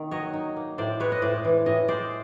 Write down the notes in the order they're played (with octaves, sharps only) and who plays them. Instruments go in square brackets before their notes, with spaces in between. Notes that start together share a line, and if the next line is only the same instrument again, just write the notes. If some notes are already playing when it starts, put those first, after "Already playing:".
Already playing: [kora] D#3 A#3
F#3 C#5 D#5
D#4
A#3
A2 C5 D5
G#3 B4 C#5
D#5
A2 C5 D5
E3
A2 C#5 D#5
G#3 C5 D5